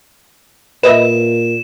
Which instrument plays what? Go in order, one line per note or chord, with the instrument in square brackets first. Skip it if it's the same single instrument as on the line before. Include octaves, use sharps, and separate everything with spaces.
[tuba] A#2 [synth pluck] B4 D#5 E5 [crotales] E7